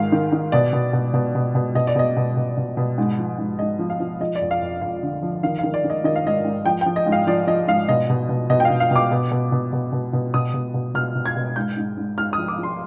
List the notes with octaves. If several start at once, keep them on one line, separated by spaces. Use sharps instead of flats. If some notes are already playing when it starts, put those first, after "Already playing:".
Already playing: G#2 D#3 F5
D#3
D#3
B2 D5
B2
B2
B2
B2
B2
B2 D#5
D5
B2 D#5
B2
B2
B2
B2
G#2
F3
G#2
G#2 D#5
F3
F5
F3
F3 D#5
D5
F2
F5
F2
F2 F5
D3
F3
D#3 F5
D#3 F5
D5
D#3
D#5
D#3 D#5
F5
G#2 D#5
G#2
F3 G5
F3 G5
D#5
G#2
F5
F3 D5
F3 D#5
G#2 F5
B2 D#5
B2
B2
B2 D#5
G5
F5
B2
F5
B2 D6
B2
B2
B2
B2
B2
B2
B2 D#6
B2
B2
B2 F6
B2
G#6
B2
G#2 G6
G#2
G#2
G#2 F6
D#6
F3
D6
F3 C6